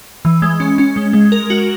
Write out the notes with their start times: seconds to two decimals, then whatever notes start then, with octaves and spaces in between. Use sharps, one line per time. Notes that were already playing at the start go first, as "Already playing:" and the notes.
0.25 E3
0.42 G#3
0.60 C#4
0.78 C#4
0.96 G#3
1.13 G#3
1.32 A#4
1.50 F#4